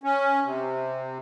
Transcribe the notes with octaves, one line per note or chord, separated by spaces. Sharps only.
C#4
C3